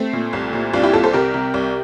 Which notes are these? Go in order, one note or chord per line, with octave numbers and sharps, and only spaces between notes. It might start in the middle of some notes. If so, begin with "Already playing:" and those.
Already playing: A3 C4
A#2
C2
A#2
C2 D4 F4
E4 G4
C2 F4 A4
A4 C5
C3 G4 A#4
C3
C2